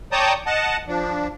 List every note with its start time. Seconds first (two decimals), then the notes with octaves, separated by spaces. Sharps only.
0.12 C#5 D5 G5 A5 A#5 D#6
0.46 D#5 F#5 A5
0.88 F3 D4